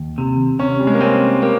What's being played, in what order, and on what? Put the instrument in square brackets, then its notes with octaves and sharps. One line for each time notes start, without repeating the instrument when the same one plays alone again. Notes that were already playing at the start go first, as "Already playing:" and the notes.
Already playing: [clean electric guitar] D#2
C3
[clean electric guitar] C3 [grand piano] C#4
[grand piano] G3
G#3
A#3
[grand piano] C4 [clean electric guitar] C#4
[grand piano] A#3 [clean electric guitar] G4